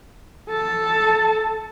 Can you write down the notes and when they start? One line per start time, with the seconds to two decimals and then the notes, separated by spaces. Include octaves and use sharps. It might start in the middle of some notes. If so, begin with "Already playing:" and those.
0.50 A4 A5